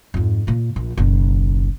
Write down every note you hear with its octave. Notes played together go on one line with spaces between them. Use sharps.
F2 G#2
A#2 A#3
A#1
F#1 B1